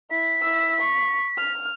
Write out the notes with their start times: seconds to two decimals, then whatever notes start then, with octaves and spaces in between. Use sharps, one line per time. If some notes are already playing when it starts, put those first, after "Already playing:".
0.11 E4 B6
0.42 E4 E6
0.80 C#6
1.38 F6